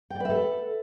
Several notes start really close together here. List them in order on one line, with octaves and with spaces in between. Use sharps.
G5 D5 B4 E5 A4